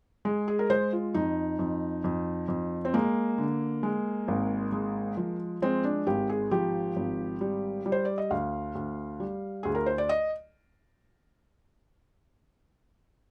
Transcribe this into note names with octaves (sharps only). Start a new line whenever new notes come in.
G#3 G#4
G#4
A#4
G#3 C5
F4
F2 D#4
F2
F2
F2
C4
G#3 A#3
D3
G#3
G#1
G#3
F3
G#3 C4
D4
G#1 G4
G#4
F3 G4
G#1
G3
G3
C5
D5
D#5
D2 F5
D2
G3
D2 G#4
A#4
C5
D5
D#5